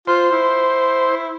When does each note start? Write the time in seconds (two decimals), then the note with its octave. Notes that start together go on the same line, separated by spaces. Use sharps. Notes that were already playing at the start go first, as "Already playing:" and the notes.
0.07 F4 C5
0.32 E4